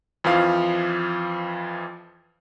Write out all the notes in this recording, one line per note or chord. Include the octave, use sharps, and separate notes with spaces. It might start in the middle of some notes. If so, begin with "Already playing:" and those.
F2 E3 F3 F5